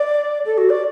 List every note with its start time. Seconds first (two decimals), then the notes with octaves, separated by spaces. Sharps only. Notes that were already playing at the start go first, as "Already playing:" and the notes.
Already playing: D5
0.45 A4
0.58 F#4
0.70 D5